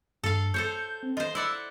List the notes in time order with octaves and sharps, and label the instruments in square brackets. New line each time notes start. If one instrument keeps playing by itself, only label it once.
[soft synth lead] G2 [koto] A4 F5
[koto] A4 C5 C#5 [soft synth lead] G6
[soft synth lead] C4
[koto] F4 C5 [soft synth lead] D#5
[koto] E4 D5 F#5 [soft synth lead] E6